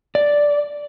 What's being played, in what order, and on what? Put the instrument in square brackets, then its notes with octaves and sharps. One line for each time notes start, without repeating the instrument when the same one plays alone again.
[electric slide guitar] D5